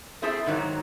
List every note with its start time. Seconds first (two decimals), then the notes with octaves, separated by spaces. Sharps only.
0.22 A3 C4 E4 G#4 A4
0.46 G#2 D#3 F#3